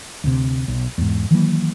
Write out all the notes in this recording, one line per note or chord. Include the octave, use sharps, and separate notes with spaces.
D2 C3
B1
E2 G#2
D#3 E3 F#3 A#3